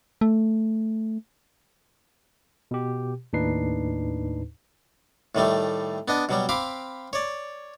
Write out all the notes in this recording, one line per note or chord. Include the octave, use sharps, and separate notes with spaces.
A3
B2 G4
D#2 A2 D4 D#4 B4 C7
A2 D#3 G3 A3
B3 D4 D#5
B2 F#3 G3
C4 F5 B5 D6
C#5 D5